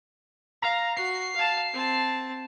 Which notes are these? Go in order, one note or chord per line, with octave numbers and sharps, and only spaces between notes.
F5 A#5
F#4 C7
F5 A5
C4 A5